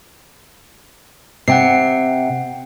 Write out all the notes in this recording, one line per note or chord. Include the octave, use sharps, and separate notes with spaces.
C3 F#5 G5 C7